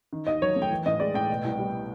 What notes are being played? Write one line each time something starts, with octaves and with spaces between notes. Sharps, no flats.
D#3
D#2 D#5
F#3 C#5
A3
G5
E3
A2 D#5
G#3 D5
A2 G5
B2
C2
G3